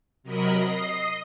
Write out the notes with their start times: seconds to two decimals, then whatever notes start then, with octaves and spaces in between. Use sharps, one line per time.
0.23 C3 F#3 A#4 D#5 B5
0.55 D#5 D#6 C7